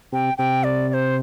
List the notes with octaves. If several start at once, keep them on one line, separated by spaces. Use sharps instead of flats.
C3 G5
C3 G5
D5
D5
C5